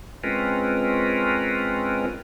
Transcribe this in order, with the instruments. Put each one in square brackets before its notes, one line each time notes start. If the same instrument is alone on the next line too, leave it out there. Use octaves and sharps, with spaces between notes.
[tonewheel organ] G#3 C4 C#4 F4 A#4 B4